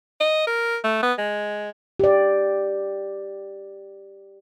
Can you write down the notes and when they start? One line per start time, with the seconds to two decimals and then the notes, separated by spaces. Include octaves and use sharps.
0.21 D#5
0.47 A#4
0.84 A3
1.03 B3
1.18 G#3
2.00 G4 D5